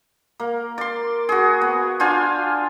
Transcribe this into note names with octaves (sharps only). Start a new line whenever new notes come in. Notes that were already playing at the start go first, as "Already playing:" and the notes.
A#3
D5 C6
F#4 G#4
B3
D4 F4 C5 G#5